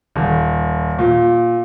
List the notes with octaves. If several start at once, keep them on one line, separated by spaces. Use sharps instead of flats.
D#1
A#2